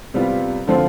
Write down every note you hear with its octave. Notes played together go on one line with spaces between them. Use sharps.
C3 G3 B3 F4
D3 F3 C4 F4